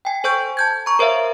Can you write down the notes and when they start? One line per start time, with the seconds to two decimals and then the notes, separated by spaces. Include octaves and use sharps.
0.05 G5 G#5
0.24 A4 C5 C#6 G6
0.57 A5 G6 G#6
0.86 A#5 C#6
0.99 A#4 C5 C#5 E5 F5